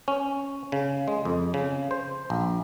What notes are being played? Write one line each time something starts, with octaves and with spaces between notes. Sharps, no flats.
C#4
C#3
G#3
F2
C#3
C5
A#1